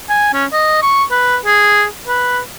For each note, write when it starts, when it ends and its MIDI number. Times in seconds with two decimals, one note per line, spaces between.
0.09 0.30 80
0.33 0.45 61
0.52 0.80 75
0.82 1.04 85
1.11 1.37 71
1.46 1.84 68
2.08 2.40 71